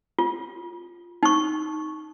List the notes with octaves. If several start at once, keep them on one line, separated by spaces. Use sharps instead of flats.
F4
D#4 C#6